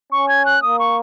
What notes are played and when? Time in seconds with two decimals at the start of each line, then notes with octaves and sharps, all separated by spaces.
0.12 C#4 C#6
0.29 G#6
0.46 F#6
0.62 A#3 D#6
0.79 C#6